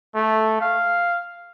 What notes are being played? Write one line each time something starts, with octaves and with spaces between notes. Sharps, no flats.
A3
F5